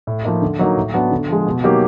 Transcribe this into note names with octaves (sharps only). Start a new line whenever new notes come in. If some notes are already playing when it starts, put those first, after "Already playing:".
A2
F3 A#3 D#4
D3
F#3 A#3 D#4
A2
F#3 B3 D4 F#4
D3
F3 G#3
B2
F#3 A#3 D#4 G4